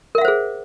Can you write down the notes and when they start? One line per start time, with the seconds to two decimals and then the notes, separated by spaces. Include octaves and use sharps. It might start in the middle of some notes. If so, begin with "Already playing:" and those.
0.15 A#4
0.18 E5
0.21 F#5
0.25 C5
0.28 G#4